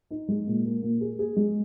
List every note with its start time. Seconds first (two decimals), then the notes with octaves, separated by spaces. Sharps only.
0.11 D#4
0.28 G#3
0.47 A#2
0.65 A#3
0.82 A#2
1.01 G#4
1.19 G#4
1.36 G#3